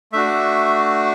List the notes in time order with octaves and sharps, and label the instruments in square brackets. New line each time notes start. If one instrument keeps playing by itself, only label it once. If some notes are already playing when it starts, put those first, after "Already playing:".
[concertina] A3 D4 F#4 E5